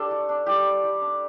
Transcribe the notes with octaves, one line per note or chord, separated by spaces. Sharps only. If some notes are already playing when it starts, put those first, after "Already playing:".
Already playing: D4 G4 A4
A3
D4
G3 G4
D4
G3
D4